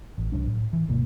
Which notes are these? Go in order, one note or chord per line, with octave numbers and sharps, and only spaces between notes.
A1
C2 F#3 D4
A2
E3
G1 D2 B2 A#3